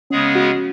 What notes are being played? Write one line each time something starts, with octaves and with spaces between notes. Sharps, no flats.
C#3 G#3 B3 C#4 G#4
F#4